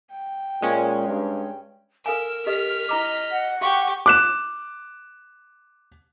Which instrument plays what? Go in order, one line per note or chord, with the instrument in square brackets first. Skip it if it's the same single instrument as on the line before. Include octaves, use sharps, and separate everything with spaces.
[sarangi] G5
[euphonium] A#2 [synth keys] G#3 C#4
[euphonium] G2
[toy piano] A4 F5 G#5 [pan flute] A#4 [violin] E6
[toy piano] G4 A4 D#5 [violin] F6 B6
[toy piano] E4 A#5 D6 [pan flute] D#5
[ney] F#5
[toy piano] F#4 F5 C6 [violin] G4 [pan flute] C#6
[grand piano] D6 F#6 E7